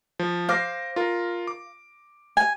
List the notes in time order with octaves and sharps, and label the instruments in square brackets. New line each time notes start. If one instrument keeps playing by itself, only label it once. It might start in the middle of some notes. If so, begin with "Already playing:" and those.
[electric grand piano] F3
[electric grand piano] C5 D6 A#6 [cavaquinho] F5
[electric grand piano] F4 A#4
D6
[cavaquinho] G#5